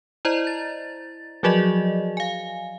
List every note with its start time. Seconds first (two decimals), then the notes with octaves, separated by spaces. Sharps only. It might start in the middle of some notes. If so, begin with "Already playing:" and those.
0.25 E4 C5 D5 D#5 A#5
0.47 A6
1.43 F3 F#3 F#4 G#4 D5 D#5
2.17 F5 G#5